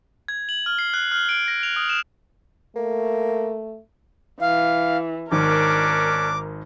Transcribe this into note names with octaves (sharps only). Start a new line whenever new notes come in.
G#6
F#7
F6
C7
F#6
F6
D7
A#6
F7
D#6
E7
A3 A#3
E3 F5
G#1 D#3 C#4 D4 A#4 D6